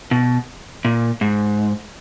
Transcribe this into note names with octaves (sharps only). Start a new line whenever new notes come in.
B2
A#2
G#2